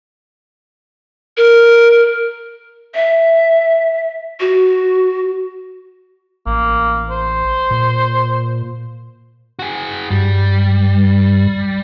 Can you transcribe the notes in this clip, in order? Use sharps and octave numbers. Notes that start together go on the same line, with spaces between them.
A#4
E5
F#4
A1 A#3
C5
A#2
F#4 G#4
G2 G3